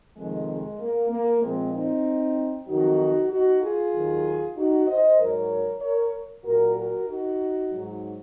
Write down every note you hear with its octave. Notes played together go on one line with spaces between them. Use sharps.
F2 C3 D#3 G#3
G#3
A#3
A#3
A#2 F3 G#3 C4
C4 D#4
F2 D#3 F#3 D#4 F#4
D#4 F#4
F4 G#4
D#2 D#3 F#3
D#4 F#4
C5 D#5
G#2 F#3 A#4 C#5
A#4 C#5
A#2 F#3 F#4 A#4
F#4 A#4
D#4 F#4
G#2 F#3